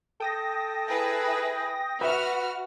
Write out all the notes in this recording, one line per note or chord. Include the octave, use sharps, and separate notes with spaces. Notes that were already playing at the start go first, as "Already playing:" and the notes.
A4 G5 D#6 A#6
E4 G#4 B4
F#4 B4 E5 F6